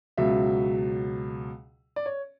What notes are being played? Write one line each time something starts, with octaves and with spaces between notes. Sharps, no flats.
C#2 B2 F#3 E5
D5
C#5